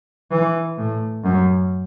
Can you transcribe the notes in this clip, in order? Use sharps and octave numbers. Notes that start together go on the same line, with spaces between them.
E3
A2
F#2